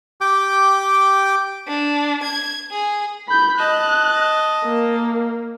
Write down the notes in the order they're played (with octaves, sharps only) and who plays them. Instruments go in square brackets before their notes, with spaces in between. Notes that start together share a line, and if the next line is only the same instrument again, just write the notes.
[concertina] G4 G5 D6
[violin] D4
G#6
G#4
[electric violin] B5 G6
[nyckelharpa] D#5 A5 [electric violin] F#6
[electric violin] A#3